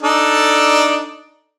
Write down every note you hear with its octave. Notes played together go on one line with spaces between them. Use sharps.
D4 D#4 A4